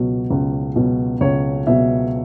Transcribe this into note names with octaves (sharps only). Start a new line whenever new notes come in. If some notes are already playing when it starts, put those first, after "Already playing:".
Already playing: C#2 B2 F#3
C#2
B2 F#3
C#2 C#5
B2 F#3 E5